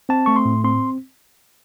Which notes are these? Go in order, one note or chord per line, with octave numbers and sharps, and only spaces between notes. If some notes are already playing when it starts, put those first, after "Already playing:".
C4 A5
A3 C#6
C6
A2
C4 C6